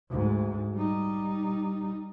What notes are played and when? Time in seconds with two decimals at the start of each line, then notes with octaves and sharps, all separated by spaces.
0.10 D2 G#2
0.74 G3 D#4